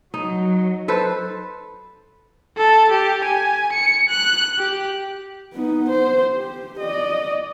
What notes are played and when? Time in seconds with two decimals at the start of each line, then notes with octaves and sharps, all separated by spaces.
0.14 F#3 D#4
0.88 A4 B4 C5
2.57 A4
2.92 G4
3.25 G#5
3.73 C#7
4.09 F#6
4.59 G4
5.54 B3 D#4
5.89 C5
6.34 G4
6.80 D5 D#5